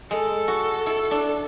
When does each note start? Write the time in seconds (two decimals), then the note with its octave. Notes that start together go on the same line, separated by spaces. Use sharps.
0.10 G#3 A4
0.48 F#4
0.86 E4
1.11 D4